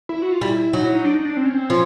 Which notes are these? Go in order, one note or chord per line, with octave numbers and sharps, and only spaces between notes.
E4
F#4
F4
G3 E4
F#3 D#4
E4
D#4
D4
D#4
D4
C4
C#4
C4
F3 C#4